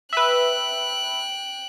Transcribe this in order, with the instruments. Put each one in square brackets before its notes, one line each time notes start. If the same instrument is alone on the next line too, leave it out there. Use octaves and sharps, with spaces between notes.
[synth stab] B4 E5 [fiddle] G5 F#6